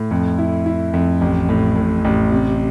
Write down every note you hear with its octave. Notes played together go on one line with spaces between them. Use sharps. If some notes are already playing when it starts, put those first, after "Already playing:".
Already playing: A2
F2
E4
E4
F2
A1
A2
A2
A1
C3